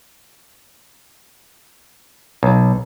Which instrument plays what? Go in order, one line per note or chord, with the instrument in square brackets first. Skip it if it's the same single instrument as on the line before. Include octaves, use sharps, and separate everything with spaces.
[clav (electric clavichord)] B1